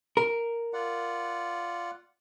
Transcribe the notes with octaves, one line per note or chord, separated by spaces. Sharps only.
A#4
F4 D5 F#5